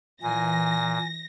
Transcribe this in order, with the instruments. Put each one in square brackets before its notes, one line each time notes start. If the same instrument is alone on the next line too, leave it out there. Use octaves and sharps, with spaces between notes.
[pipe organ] A#2 [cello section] E3 [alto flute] G#5 [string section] A#6